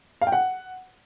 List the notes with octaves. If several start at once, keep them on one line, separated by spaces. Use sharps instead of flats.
F5
G5
F#5